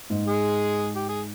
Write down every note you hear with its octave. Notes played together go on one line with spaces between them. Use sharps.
G#2
G#3 G#4
G4
G#4